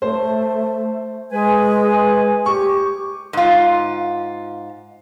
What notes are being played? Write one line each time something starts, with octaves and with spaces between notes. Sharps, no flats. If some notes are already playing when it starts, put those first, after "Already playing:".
A3 C5
G#3 B4 G#5
G4 C#6
G#2 F4